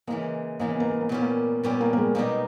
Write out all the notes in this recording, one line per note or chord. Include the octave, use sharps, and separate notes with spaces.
C#3 E3 G#3 A#3
C#3 E3 G#3 A#3
B3
A#3
B3
A#3
A#2 G3 B3 C#4 G4
A#3
A#2 G3 B3 C#4 G4
A#3
A#3
G#3
B2 G3 A#3 B3 D#4 G4